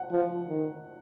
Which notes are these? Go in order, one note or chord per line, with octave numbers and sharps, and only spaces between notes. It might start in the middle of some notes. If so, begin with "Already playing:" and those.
Already playing: F#5
F3
D#3